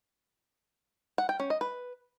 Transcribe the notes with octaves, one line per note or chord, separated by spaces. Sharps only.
F#5
G5
C#4
D#5
B4